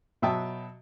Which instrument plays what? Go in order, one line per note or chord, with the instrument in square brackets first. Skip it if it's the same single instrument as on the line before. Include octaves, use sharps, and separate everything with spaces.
[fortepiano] B2 F#3 E5 G5 A5 D#6